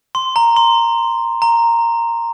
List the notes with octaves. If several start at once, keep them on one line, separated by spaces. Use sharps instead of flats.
C6
A#5
C6
A#5